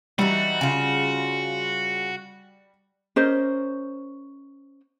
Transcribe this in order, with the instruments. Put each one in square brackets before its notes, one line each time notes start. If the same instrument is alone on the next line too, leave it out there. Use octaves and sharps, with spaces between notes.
[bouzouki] E3 D#4 [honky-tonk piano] G3 [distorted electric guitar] F#4
[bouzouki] C#3 F4
[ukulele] C#4 A#4 C5 D#5